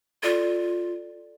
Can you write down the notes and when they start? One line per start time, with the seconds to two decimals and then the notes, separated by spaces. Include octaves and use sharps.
0.23 F4 A4 D5